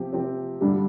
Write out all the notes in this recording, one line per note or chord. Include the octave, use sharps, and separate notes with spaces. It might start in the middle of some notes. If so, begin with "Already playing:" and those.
Already playing: C3 F3 C4 G4
C3 F3 C4 G4
G2 D3 G3 D4